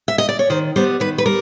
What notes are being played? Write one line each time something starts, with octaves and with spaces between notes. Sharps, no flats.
E5
D#5
D5
C#5
D#3 C5
G3 B3 C5
D#3 B4
B4
G3 A#4